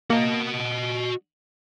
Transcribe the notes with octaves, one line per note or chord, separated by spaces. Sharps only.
A#3 F#4 D#5